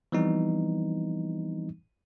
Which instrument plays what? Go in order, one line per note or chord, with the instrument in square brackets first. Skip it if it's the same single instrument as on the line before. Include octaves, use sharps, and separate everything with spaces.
[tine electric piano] E3 F3 G3 B3 C4 D#4